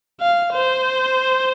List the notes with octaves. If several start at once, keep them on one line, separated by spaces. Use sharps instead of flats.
F5
C5